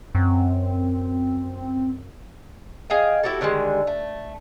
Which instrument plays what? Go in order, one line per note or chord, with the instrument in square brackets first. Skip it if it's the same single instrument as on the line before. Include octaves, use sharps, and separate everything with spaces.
[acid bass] F#2 [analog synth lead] C4
[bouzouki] G#4 D#5 F5 G5
E4 F#4 G4 A4
D3 D#3 G3 G#3
A3